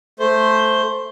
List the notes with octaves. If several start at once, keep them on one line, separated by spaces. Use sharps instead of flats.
A3 C5